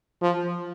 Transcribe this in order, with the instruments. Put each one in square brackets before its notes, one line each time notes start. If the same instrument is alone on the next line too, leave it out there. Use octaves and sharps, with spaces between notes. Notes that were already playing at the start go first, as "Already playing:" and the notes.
[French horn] F3